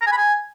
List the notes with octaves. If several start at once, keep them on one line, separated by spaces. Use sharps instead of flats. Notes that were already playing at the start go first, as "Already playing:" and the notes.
A#5
G#5
B5
G#5